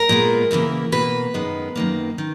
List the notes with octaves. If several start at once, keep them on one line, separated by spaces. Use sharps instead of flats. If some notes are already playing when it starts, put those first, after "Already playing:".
Already playing: A#4
A#2 G#3 B3
E2 C#3 E3 A#3
B2 A#3 B4
F#2 D#3 G#3 B3
F#2 D#3 A#3
D#3